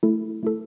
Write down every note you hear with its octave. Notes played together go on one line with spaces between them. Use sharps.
A3 E4 A4
A3 E4 A4